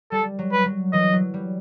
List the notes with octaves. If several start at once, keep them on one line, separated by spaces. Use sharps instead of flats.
G3 A4
F#3
B4
F#3
E3 D#5
F#3
G3